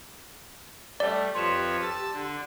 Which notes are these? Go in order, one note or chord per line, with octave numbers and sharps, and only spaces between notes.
G3 A3 D5
F2 G4 B4 C#5 C6 E7
A5 E6
D3